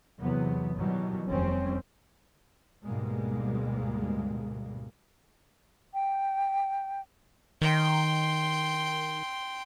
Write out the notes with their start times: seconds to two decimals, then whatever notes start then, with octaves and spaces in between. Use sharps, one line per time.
0.21 E2 C3 F#3 B3
0.77 B2 D#3 E3 F#3 G3
1.27 F1 D#2 G3 C4 C#4
2.85 D2 G#2 B2 G3 G#3 A#3
5.94 G5
7.62 D#3 G5 C6